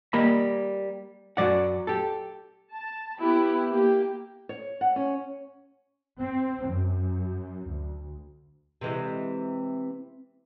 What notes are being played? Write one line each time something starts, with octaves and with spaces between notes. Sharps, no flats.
G3 A#3 D#5 B5
F#2 E3 F#3 D5 F#5
G4 A4
A5
B3 E4 G4 B5
A#3 G4
C#5
F#5
C#4
C4
F#2
D2
C3 E3 G#3